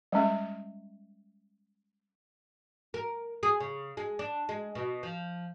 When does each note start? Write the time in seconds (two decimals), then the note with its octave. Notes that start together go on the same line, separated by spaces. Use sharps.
0.12 G3 G#3 C#4 E5
2.94 A#4
3.43 G#4
3.60 C#3
3.97 G#3
4.19 D4
4.49 G#3
4.75 B2
5.03 F3